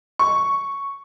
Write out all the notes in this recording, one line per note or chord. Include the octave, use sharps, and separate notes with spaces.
C#6